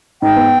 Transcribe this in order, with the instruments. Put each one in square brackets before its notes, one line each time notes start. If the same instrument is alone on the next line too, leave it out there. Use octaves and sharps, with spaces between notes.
[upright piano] G#2 [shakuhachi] G5
[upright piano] B3